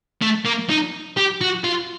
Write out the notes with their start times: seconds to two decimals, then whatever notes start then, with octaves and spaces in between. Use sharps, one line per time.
0.21 A3
0.45 A#3
0.69 D#4
1.17 G4
1.41 F#4
1.64 F4